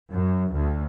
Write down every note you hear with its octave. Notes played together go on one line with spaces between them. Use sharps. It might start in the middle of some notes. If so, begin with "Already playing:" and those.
F#2
D2